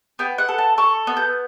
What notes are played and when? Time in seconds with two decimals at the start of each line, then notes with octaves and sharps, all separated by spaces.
0.19 B3 G5
0.38 F#5
0.49 A4
0.58 A5
0.78 A4 C#6
1.07 B3
1.17 G6